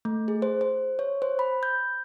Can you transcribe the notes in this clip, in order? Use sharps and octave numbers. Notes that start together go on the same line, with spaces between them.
A3
G#4
C5
C5
C#5
C5
B5
G6